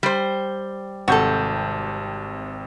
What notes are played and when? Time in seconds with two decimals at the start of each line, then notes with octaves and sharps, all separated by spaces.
0.03 G3 C5
1.08 G#1 C3 F#4 A4 G6